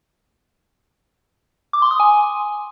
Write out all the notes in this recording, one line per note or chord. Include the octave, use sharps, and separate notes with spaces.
D6
C6
D#6
G#5